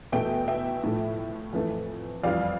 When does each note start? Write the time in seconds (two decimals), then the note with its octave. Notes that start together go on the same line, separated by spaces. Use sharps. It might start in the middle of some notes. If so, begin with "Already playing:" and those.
0.12 E2 B2 A3 E5 G5
0.48 E5 G5
0.83 A2 F3 A3
1.53 F2 E3 A3
2.23 F2 E3 G3 D5 F5